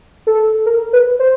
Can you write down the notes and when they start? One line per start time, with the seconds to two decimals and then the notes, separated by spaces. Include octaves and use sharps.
0.27 A4
0.66 A#4
0.93 B4
1.19 C5